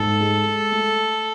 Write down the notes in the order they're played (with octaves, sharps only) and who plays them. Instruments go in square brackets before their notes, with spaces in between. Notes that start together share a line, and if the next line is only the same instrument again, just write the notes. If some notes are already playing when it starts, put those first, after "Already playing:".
Already playing: [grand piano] G#2 [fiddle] A4
[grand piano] G#3
G#3
A3